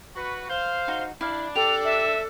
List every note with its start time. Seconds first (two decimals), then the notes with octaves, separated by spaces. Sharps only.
0.15 F#4 B4
0.49 C5 F5
0.88 D#4 F#4
1.21 D4 E4 F5
1.55 G4 A4 F7
1.85 E5